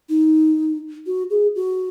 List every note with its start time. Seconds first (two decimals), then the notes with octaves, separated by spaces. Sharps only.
0.09 D#4
1.07 F#4
1.30 G#4
1.56 F#4